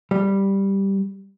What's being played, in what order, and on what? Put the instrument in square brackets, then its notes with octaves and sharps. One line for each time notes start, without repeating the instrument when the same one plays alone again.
[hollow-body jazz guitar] G3